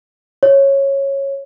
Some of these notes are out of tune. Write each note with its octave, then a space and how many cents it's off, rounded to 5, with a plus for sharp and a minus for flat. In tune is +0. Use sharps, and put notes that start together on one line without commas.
C#5 -10